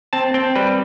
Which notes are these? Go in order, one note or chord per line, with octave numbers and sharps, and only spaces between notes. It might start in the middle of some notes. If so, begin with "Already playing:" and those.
C4 A5
C4 G5
G3 B4